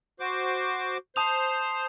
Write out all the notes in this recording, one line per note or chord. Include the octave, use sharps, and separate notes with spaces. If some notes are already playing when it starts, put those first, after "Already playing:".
F#4 C5 D6
C5 A5 D#6 F7